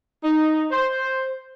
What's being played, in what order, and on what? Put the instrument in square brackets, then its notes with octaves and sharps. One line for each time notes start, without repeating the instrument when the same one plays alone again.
[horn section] D#4
C5